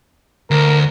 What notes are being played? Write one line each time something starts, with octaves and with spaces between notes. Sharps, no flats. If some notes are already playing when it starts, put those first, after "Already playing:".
D2 A#4